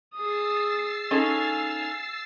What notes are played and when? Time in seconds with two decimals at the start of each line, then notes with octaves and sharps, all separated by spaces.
0.14 G#4 D#6 E6 A6 C7
1.11 C#4 D#4 A4 F5 G#5